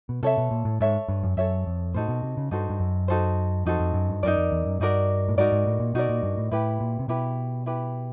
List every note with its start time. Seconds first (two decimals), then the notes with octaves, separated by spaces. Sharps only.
0.09 B2
0.23 C3 A4 C#5 E5
0.38 B2
0.51 A#2
0.65 A2
0.80 G#2 A4 C#5 E5
1.09 G2
1.23 F#2
1.37 F#2 A4 C#5 E5
1.66 F2
1.94 A2 D#4 F#4 A4 C5
2.08 B2
2.23 C3
2.37 C#3
2.51 G2 D#4 F#4 A4 C5
2.70 G2
2.80 F#2
3.08 D#4 F#4 A4 C5
3.66 F2 D#4 F#4 A4 C5
3.80 F2
3.94 F#2
4.09 G2
4.23 F#2 D#4 F#4 A#4 D5
4.38 F2
4.52 E2
4.65 F#2
4.80 G2 D#4 F#4 A#4 D5
5.29 A2
5.37 G#2 D#4 F#4 A#4 D5
5.52 G#2
5.66 A2
5.80 A#2
5.94 B2 D#4 F#4 A#4 D5
6.09 A#2
6.23 G2
6.37 A2
6.51 A2 E4 G4 B4
6.80 A#2
6.99 C3
7.08 B2 E4 G4 B4
7.66 E4 G4 B4